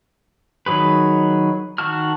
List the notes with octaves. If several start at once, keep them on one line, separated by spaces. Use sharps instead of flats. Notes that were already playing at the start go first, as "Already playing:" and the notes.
D#3 F#3 G#4 B4
D#3 F#4 A5 F6